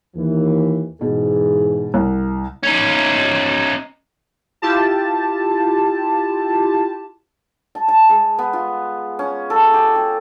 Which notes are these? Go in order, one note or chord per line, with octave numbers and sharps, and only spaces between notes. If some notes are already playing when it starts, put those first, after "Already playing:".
D#2 E3
G#2 B2 E3 G#4
C2
C#4 D#4
E4 F4 G4 A5
A5
A5
G#3
B3
F4
C#4
A4
G4
G4